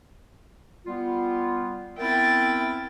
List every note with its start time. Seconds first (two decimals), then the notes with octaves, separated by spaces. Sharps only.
0.86 G3 B3 F4
1.98 B3 C4 E4 A#4 G5 A6